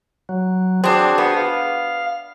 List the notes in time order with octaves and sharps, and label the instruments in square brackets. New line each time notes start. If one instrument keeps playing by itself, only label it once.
[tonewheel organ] F#3
[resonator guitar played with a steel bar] C4 D4 [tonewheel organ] F#4 G#4 C5
[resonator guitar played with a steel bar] B3
[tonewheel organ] F5